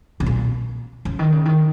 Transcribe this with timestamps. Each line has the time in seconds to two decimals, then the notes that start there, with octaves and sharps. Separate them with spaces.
0.20 C3
0.26 A#2
1.05 C#3
1.19 D#3
1.32 C#3
1.45 D#3